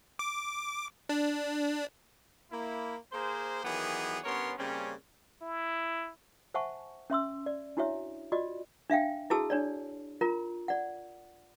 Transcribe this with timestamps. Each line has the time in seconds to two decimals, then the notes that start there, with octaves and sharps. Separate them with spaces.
0.19 D6
1.09 D4
2.51 A#3 E4
3.12 A#3 G#4 A#4 C5
3.63 D#3 E3 F#3 B3 G4 G#4
4.24 G2 B3 C#4 A#4 C#5 C6
4.57 C#3 G3 A#3 C4 C#4
5.41 E4
6.54 C5 E5 F#5 G#5 A5 C#6
7.10 C#4 E5 C6 E6
7.46 D5
7.77 D4 E4 F#4 C#5 E5
8.32 F4 F#4 D5 D#5
8.90 D4 E5 F5 G5
9.30 E4 F#4 G#4 A4 A5 E6
9.50 D4 C#5 D5
10.21 F4 A#4 A#5
10.68 D5 F#5